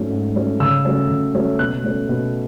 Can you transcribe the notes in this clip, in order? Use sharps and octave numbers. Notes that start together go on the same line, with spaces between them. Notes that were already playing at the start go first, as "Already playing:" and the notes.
Already playing: G#2 F#3 A3 C#4
G#2
F#3 A3 C#4
C#3 E6
F#3 A3 C#4
C#3
F#3 A3 C#4
B2 F#6
A3 C#4
B2